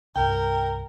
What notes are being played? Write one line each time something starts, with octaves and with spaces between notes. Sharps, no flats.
C2 G2 A#4 G5